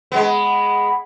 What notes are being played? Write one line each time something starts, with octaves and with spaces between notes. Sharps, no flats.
G#3 B3